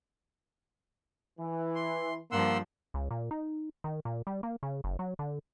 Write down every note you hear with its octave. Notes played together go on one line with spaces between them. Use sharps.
E3
C6
G2 F3 A#3 F#5 C6 E6
C#2
A#2
D#4
D#3
A#2
G3
A#3
C#3
F#1
F#3
D3